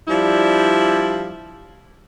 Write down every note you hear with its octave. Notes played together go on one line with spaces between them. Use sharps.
F3 G3 D4 E4